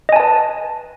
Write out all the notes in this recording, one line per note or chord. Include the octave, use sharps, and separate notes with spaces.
B4 D#5 G#5 A5